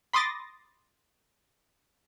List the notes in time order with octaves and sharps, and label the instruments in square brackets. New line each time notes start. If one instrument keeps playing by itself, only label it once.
[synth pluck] B5 C6 D6 D#6 A6 A#6